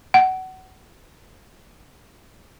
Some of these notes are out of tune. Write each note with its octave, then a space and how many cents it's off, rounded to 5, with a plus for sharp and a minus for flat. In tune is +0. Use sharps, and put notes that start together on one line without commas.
F#5 +25